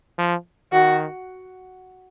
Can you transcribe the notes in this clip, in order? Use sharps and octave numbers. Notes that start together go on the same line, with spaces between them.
F3
D#3 F#4